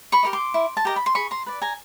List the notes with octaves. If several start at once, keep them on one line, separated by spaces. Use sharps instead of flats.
B5 C#6
G4 A#4 D#5
C6 D6
E4
A5
G4 A#4 D#5 A#5
B5
C6
G#4 B5 C#6
A#5 C6
B4 D5
G#5 A#5